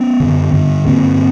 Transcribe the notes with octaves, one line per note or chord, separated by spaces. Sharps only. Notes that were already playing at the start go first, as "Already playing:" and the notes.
Already playing: B3 C#4
F#2 D3
G2 D3
G2 D3 A#3 C4